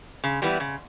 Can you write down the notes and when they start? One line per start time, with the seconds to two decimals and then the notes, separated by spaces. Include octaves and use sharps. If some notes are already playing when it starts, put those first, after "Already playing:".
0.24 C#3
0.42 E3 G3 B3 E4
0.60 C#3